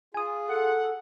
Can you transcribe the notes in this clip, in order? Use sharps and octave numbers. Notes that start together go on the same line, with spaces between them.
F4 G#4 G#5 D#6
A4 F#5